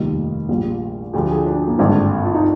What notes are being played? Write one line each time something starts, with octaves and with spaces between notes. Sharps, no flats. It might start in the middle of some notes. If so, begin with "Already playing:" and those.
Already playing: F1 D#2 D#3 G3 F4
A#1 A#2 G3
D2 D3 F3 G4
G#4
D4
A#3
G#1 G2 D3 C4
F4
D#4